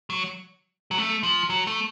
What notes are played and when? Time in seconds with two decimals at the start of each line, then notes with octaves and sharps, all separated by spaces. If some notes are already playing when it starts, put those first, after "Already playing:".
0.10 F#3
0.91 F#3
0.98 A3
1.23 F3
1.50 F#3
1.67 A3